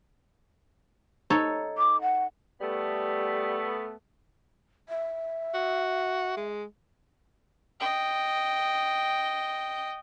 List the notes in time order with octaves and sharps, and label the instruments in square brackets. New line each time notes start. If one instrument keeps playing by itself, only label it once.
[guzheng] D#4 A4 C#5
[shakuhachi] D6
F#5
[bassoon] G3 [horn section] A3 B3
[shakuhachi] E5
[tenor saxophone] F#4
G#3
[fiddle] D#5 G5